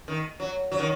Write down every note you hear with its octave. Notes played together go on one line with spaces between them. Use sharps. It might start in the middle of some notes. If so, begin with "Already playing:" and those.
D#3
F#3
F#3
D#3